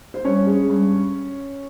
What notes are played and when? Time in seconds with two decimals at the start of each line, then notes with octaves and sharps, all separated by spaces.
0.14 C5
0.25 G2 C#4 C#5
0.47 G#3
0.69 G2